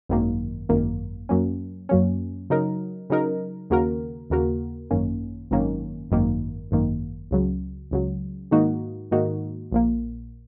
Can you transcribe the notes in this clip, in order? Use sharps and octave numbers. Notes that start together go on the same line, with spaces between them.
G#1 F#2 D#3 A#3
G#1 F#2 D#3 A#3
F#2 F#3 A#3 C#4
F#2 F#3 A#3 C#4
C#3 F#3 D#4 A#4
C#3 F#3 D#4 A#4
D#2 C#3 A#3 F#4 A#4
D#2 C#3 A#3 F#4 A#4
G#1 F#2 D#3 A#3 C#4
G#1 F#2 D#3 A#3 C#4
G#1 F#2 D#3 A#3
G#1 F#2 D#3 A#3
C#2 C#3 F#3
C#2 C#3 F#3
G#2 D#3 A#3 D#4 F#4
G#2 D#3 A#3 D#4 F#4
A#1 A#2 A#3